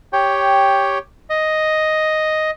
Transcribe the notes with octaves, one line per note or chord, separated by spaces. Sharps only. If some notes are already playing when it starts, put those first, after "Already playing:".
G4 C#5 G5
D#5